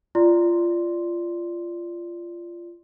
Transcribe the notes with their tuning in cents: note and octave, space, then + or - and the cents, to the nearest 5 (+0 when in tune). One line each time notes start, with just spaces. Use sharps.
F4 -20 D5 +0 C6 +0